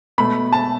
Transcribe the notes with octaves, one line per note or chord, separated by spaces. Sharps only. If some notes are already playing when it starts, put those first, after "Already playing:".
B2 A3 B5
A5